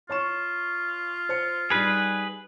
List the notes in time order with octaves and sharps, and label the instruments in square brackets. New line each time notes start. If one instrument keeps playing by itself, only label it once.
[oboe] F4 [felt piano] C#5 C#6 E7
[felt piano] C5 C#7
[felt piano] G3 D#4 G4 [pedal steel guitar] G#4 B4